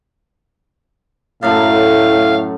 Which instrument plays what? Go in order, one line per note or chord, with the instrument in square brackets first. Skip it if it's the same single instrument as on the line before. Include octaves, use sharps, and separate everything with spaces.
[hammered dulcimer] F#2 F#3 A3 [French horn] A2 [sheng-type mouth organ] F5